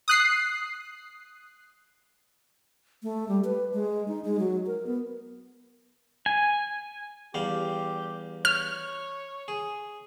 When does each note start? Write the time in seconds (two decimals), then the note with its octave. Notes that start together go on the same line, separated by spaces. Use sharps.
0.08 D#6 F#6 C7
3.03 A3
3.28 G3
3.44 B4
3.74 G#3
4.08 D#4
4.25 G#3
4.39 F#3
4.67 A#4
4.87 B3
6.26 G#5
7.34 E2 G3 G4 F5
8.45 C#5 F6
9.48 G#4